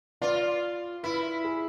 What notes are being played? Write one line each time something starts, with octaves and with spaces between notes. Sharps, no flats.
F4 D5
E4 B4
G#4